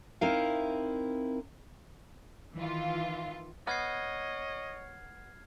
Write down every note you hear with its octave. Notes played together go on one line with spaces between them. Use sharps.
C4 D#4 E4 A#4 F5
D#3 E3 F4
B3 C#5 D#5 F6 G#6 C7